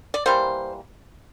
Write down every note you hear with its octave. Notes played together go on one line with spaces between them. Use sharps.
D5
E3 G3 A#3 C5